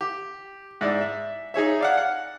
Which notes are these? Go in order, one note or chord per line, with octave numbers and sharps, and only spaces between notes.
G4
G#2 E4 D5
E5
D#4 G#4 C#5 E5
D5 F5 F#5
F#5